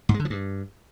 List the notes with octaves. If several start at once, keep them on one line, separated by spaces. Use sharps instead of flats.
G#2
G#3
D3
F3
G2